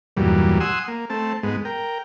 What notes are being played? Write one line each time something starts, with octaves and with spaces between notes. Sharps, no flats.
E2 G2 A#2 F#3 G3
F#5 G#5 C6 D#6 E6
A#3
A3 C4 A5
G#2 G#3 B3
A#4 G5